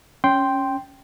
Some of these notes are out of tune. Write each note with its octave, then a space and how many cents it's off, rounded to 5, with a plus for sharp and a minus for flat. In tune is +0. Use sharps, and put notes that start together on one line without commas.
C#4 +0 G5 +0 C6 +0